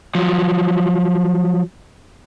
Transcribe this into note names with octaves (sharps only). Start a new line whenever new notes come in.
F3 F#3